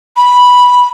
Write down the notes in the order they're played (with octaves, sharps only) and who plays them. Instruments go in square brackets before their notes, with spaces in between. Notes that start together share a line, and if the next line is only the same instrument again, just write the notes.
[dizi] B5